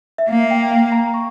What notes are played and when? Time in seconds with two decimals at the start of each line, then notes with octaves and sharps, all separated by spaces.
0.18 E5
0.29 A#3 F5
0.51 G5
0.71 F5
0.92 A#5
1.14 C#6